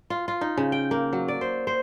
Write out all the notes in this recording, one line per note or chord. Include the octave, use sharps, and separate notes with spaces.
F4
F4
D#4
C#3
G5
A#3
F#3
D5
C5
C5